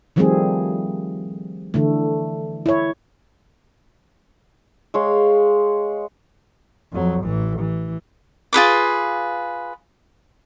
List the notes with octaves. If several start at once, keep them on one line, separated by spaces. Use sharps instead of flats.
D#3 F3 G3 A3 C4 G#4
D3 E3 A3
E4 C#5
G#3 C#5 F5
F2 F#3
A1 E3
E3
F4 G#4 B4 D6